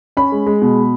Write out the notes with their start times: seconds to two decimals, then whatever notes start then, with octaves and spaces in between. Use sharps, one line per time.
0.17 C#4 B5
0.32 G#3
0.46 G#3
0.62 B2